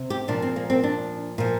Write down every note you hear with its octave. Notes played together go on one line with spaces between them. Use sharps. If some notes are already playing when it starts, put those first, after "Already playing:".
Already playing: C3
G4
A#2 F3 D4
C4
A#3
C4
D4
A#2 F3